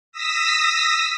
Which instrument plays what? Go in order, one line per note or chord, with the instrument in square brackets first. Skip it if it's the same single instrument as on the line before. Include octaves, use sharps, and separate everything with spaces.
[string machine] D#6 E6 A#6 B6